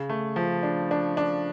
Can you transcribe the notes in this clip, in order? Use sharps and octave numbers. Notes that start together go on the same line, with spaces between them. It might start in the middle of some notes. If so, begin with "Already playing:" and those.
Already playing: C#3
A3
F3
D4
D4
D4